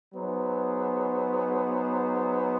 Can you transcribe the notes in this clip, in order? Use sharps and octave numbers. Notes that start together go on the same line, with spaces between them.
F#3 B3 D#4 G#4 C5